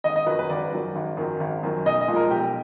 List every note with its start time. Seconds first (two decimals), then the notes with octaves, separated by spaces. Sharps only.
0.04 G#1 D#5
0.16 D#5
0.27 F#2 D#3 F#3 B4
0.39 B4
0.50 G#1 D5
0.73 F#2 D#3 F#3
0.96 G#1
1.17 F#2 D#3 F#3
1.40 G#1
1.63 F#2 D#3 F#3
1.85 B1 D#5
2.01 D#5
2.08 A#2 F3 G#3
2.16 A#4
2.31 B1 G4